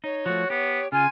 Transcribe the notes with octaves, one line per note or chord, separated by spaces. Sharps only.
D#4 C#5
F3 A3 F#4
B3 G4
C#3 F4 G#5 C6